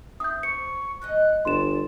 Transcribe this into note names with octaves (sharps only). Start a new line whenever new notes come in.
C4 E5 D#6 G6
C5 C#6 C#7
F2 G#2 D#5 F#6
G1 D5 C6 E7